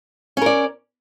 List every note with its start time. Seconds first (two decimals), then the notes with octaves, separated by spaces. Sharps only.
0.37 C#4
0.41 A#4
0.46 D5